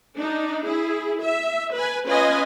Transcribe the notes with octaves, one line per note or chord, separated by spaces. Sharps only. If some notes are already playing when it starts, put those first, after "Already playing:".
D4 D#4
E4 G#4
E5
B4 G#5
C#4 F4 B4 D#5 G#5